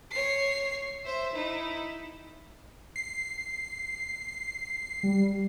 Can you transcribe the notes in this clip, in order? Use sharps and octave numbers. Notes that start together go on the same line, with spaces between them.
C#5 C7
C5 E5
D#4 E4
C7
G3